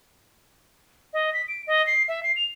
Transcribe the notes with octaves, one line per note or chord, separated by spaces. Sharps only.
D#5
B6
D7
D#5
C7
E5
C7
F7